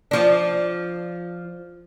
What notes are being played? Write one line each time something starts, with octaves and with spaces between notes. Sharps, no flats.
F3 D4